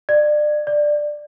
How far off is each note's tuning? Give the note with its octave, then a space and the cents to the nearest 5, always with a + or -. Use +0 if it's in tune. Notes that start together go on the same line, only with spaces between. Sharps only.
D5 +30
D5 +10